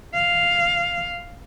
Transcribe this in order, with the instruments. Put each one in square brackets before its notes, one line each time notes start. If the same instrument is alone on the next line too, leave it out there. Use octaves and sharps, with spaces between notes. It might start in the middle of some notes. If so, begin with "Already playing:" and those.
[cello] F5